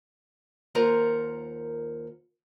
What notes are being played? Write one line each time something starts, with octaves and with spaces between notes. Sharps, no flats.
D#2 F4 A#4 C5 F#5 A#5